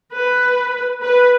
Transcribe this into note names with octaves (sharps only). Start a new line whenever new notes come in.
B4
B4